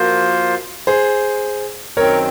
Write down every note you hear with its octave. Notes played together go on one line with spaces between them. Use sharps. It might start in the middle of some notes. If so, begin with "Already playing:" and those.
Already playing: F3 A#3 F4 F#4 A#4 C5
G#4 C5
F#2 D#3 F#3 C4 A#4 C#5